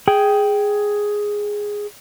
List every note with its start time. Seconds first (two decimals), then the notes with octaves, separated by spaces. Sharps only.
0.08 G#4 G5